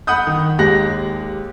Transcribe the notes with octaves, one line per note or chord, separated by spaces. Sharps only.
F#5 B5 D#6 G6
D#3
D#2 G#3 G4 F#6 A#6